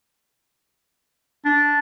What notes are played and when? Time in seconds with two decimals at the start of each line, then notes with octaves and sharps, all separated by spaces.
1.45 D4